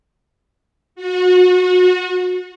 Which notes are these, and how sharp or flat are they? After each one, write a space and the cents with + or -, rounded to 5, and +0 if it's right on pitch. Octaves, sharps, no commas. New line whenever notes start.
F#4 -30